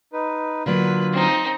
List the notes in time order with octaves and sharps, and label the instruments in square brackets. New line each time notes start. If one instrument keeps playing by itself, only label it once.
[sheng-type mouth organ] D#4 B4
[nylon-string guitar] D3 F#3 A#3 [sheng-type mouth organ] F4 [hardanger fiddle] B4
[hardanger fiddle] C4 D#4